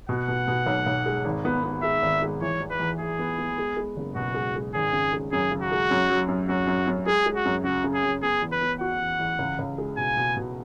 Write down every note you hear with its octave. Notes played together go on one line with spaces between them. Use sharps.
B2 F#5
B2
B2
B1
B1
G#3
G#1
B3
B3
G#3 E5
G#1
G#3
E3 C#5
E2
B4
E2
E2 G#4
B3
B3
G#3
G#3
F#1
B2 F#4
G#3
G#3
G#1 G#4
C#3
G#3
F#2 G#4
C#3
F#4
G#3
F#2
F#3
F#2
F#2 F#4
F#2
F#2
G#3 G#4
G#3
F#4
F#2
C#3 F#4
C#3
G#4
F#2
B3 G#4
E2
B4
B3
F#4 F#5
E2
E2
C#2
C#2
G#3
B2 G#5
B2
B2